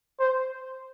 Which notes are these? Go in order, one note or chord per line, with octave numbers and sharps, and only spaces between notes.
C5